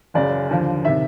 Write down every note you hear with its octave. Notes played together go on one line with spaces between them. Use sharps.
F#1 F#2 C#3 D5
D#2 D3 F3
C3 D#3 E5